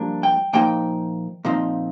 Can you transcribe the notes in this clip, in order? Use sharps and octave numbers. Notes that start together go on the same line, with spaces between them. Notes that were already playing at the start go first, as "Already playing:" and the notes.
Already playing: G2 F3 A#3 D4
G5
A#2 F3 A#3 D#4 G5
A#2 F3 C4 D#4